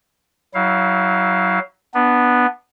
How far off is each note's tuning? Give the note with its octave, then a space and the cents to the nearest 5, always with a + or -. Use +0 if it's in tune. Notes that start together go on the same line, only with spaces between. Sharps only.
F#3 +15 E4 -25 F5 +0
B3 -5 D4 +10